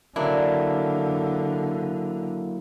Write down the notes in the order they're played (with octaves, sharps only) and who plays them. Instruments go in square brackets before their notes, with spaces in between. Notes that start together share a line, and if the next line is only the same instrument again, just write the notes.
[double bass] D3 [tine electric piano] F#3 A#3 E4 [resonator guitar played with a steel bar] D4